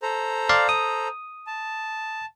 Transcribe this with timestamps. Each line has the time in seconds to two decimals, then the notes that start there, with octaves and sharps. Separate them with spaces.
0.02 A4 C5 A#5
0.49 D5 F5 C6
0.69 D#6
1.47 A5